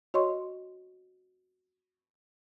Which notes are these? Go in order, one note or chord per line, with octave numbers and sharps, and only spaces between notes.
F#4 C#5 D#5 C6 C#6